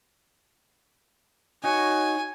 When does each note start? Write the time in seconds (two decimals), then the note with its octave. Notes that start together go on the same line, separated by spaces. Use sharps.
1.64 D#4 F#4 C#5 G#5